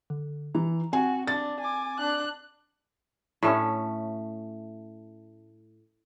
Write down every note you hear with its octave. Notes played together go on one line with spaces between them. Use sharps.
D3
E3 A#5
C4 F#4 G#5
D4 A6
G#5 D6
D4 F#6
A2 A3 C#4